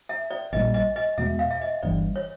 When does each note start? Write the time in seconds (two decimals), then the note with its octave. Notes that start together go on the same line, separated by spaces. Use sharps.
0.09 E5
0.31 D5
0.52 A#1 A#2 G3 D#5
0.74 D#5
0.96 D#5
1.18 E2 B2 G#3 B3 E5
1.39 F5
1.51 E5
1.61 D#5
1.83 G1 G2 E3 G3 D5
2.16 C#5